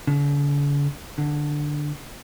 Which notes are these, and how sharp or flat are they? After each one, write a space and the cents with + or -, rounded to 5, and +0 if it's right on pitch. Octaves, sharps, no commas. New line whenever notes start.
D3 -45
D3 +10